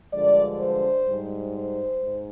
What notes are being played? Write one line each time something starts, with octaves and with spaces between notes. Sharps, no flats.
G2 D3 F3 G#3 D5
C5
G#2 G3
C5
G#2